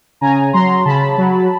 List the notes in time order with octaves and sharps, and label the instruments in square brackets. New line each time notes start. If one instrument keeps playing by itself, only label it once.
[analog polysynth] C#3 G#5 A#5
F#3 A#5 C6
C#3 A5 B5
F#3